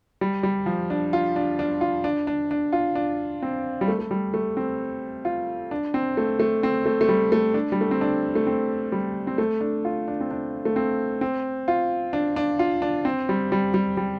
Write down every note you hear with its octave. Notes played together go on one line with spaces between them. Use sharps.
G3
G3
F3
D4
F4
D4
D4
F4
D4
D4
D4
F4
D4
C4
G3
A3
A3
G3
A3
C4
F4
D4
C4
A3
A3
C4
A3
A3
G3
A3
D4
G3
A3
C4
D4
A3
C4
G3
C4
A3
D4
F4
D4
C4
D4
A3
C4
C4
F4
D4
D4
F4
D4
C4
G3
G3
G3
G3